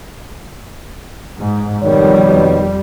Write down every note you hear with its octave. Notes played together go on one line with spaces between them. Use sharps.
G#2
F2 B2 D#3 G3 C#5